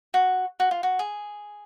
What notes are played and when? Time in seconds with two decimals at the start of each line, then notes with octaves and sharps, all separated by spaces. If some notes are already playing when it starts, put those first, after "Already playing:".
0.14 F#4
0.60 F#4
0.71 F4
0.83 F#4
0.99 G#4